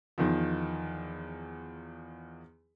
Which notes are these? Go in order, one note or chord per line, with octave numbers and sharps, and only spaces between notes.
E2 D#3 F3